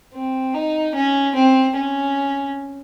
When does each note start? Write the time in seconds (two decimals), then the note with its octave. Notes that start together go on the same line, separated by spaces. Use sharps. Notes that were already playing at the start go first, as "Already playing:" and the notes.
0.14 C4
0.54 D#4
0.95 C#4
1.35 C4
1.76 C#4